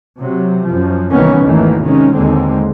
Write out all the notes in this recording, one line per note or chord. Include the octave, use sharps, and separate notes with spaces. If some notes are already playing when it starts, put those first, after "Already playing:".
C3 F#3
F#2 F3
C2 D#3 E3 A#3 B3 C#4
G#1 E2 D#3 E3 A3 A#3
C3 D#3 G#3 C#4
D#2 G#2 D3 G#3 C4